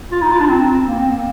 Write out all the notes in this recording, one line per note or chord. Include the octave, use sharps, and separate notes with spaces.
F4
D#4
F4
D4
C4
A#3
C4
A#3